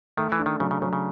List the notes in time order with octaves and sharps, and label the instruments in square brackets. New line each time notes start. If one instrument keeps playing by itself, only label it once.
[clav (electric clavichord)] D#3 [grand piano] A3
[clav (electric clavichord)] E3
[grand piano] D4
[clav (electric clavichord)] D#3
[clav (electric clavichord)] C#3 [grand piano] F#3
[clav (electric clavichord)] C#3
[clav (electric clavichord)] C#3 [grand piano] F#3
[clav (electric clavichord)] C#3